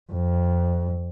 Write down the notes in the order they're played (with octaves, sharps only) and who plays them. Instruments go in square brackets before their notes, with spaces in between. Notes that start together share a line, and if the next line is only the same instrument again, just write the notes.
[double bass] F2